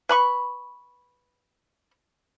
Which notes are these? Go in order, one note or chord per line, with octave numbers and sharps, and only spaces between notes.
B4 B5 C#6